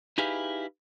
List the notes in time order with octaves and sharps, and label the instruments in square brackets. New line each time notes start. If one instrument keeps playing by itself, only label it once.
[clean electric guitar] D#4 E4 G4 G#4 B4 F5